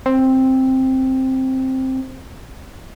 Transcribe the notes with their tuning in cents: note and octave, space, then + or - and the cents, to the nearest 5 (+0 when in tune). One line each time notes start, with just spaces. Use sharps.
C4 +5